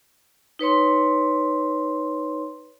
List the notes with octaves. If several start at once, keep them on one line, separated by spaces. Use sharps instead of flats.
D#4 B4 C#5 C6